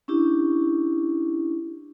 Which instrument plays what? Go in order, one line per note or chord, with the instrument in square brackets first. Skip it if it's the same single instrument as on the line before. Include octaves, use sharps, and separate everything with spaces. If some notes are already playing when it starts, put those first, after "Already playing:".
[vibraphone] C#4 D4 E4 G4